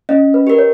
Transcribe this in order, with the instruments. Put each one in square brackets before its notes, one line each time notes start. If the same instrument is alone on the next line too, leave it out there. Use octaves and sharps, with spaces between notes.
[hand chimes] C#4 [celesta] D#5
[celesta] B4
[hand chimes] G4 A#4
[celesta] C#5